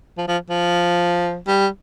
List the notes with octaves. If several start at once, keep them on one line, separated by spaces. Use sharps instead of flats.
F3
F3
F3
G3